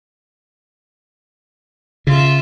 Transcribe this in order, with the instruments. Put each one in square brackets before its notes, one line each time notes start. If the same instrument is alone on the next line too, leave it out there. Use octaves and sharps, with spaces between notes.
[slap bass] C#3 [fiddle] F4 E5